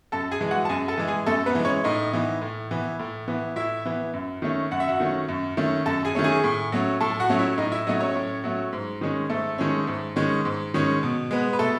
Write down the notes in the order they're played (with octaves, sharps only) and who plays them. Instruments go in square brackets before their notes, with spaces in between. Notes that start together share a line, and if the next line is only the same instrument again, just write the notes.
[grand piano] F#2 A4 A5
G#4 G#5
E3 G#3
F#4 F#5
A5
F#2 G#4 G#5
A4 A5
E3 G#3
G#4 G#5
F#2 A3 A4
B3 B4
E3 G#3
C#4 C#5
A2 D#4 D#5
E3 B3
A2
E3 B3
A2
E3 B3
A2 E4 E5
E3 B3
F#2
D#3 A3 C#4
F#2 F#5
E5
F#4 F#5
D#3 A3 C#4
F#2
D#3 A3 C#4
F#2 A4 A5
G#4 G#5
D#3 A3 C#4
G#4 G#5
A2
F#3 A3 C#4
A2 A4 A5
F#4 F#5
F#3 A3 C#4
E4 E5
A2 D#4 D#5
E4 E5
F#3 A3 C#4 D#4 D#5
C#4 C#5
A2
F#3 A3 C#4
G#2
D#3 G#3 C#4
G#2 A3 A4
D#3 G#3 C#4
G#2
D#3 G#3 C#4
G#2
D#3 G#3 C#4
B2
G#3 B3
B4
B2 A3 A4